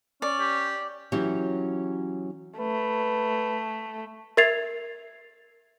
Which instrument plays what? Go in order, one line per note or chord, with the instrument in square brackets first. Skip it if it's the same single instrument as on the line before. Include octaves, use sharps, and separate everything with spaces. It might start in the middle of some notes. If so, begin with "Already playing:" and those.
[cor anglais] C#4 [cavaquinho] D5
[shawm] G4
[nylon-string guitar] E3 F#3 C#4 G4 C#5
[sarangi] A3 [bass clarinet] B4
[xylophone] A#4 E5 G#6 A6 C7 F7